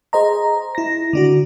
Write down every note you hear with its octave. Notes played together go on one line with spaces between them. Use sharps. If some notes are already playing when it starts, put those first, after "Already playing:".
G#4 C5 D#5 A#5
E4 A#6
D3 D4 F#4